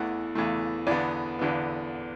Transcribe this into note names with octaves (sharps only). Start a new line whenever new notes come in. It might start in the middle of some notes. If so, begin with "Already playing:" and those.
Already playing: E2 E3 A3 F#5
E2 E3 A3
E2 D3 B3 D5
E2 D3 B3